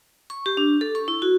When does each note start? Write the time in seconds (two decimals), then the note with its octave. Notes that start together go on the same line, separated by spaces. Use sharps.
0.30 C#6
0.46 G4
0.57 D4
0.81 A4
0.95 C#6
1.08 E4
1.22 F#4